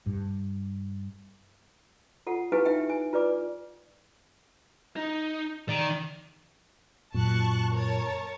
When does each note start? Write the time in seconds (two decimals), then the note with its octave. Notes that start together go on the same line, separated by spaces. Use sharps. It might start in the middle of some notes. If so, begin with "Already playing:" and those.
0.06 G2
2.27 F4 A4 F#5
2.52 E4 G4 G#4 B4 F5 G#5
2.65 D#4 E5 G5
2.89 G#5
3.13 F4 B4 D5 D6
4.96 D#4
5.69 D#3 D5
7.14 F#2 A#2 A5 C#6 F#6
7.74 A#4 C#5 A5